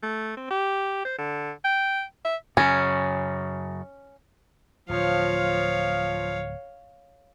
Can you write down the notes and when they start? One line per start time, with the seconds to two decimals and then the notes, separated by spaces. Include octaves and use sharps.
0.03 A3
0.37 C4
0.51 G4
1.05 C5
1.18 D3
1.64 G5
2.25 E5
2.57 F#2 C#3 C#4
4.89 D1 F3 C#5 F5